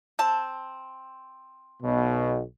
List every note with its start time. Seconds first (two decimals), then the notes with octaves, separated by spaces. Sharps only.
0.19 C4 A5
1.83 B1 B2